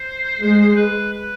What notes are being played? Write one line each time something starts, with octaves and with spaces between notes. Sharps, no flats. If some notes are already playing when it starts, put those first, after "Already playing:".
Already playing: C5
G#3
C5
B4
B4